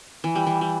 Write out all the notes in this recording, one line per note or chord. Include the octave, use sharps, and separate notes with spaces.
E3
G3
E3
G3